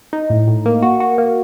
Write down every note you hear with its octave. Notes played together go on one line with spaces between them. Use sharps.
D#4
A2
A2
A#3
F#4
F#4
A#3